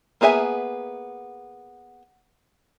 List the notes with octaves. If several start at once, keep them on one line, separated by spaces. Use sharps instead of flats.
A#3 B3 G#4 E5 G#5